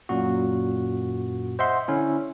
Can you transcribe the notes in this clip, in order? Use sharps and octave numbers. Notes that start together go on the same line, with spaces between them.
F#2 A#2 F#4
C5 D#5 E5 F#5 C6
D3 C#4 E4